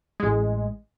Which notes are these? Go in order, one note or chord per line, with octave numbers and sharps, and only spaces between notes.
A1 G#3